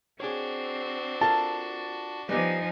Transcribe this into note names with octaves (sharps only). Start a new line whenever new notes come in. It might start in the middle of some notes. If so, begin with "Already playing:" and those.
C4 D4 F#4 G#4 C#5
F4 A4 A#4 A5
F3 G3 B3 D#4 G4 G#5